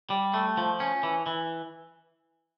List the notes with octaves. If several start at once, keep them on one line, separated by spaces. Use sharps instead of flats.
G3
A3
F3
C#4
E3
E3